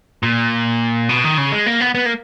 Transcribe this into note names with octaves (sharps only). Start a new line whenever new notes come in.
A#2
B2
D#3
C#3
G#3
A#3
B3
B3
A#3